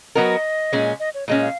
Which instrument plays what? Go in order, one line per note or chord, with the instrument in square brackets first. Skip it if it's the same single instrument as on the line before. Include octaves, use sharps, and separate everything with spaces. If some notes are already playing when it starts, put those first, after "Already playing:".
[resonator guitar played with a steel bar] F#3 B3 F#4 A#4 [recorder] D#5
[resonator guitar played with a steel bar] A#2 G#3 C#4
[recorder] D#5
C#5
[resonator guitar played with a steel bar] A#2 G#3 C#4 [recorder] D#5
[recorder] F5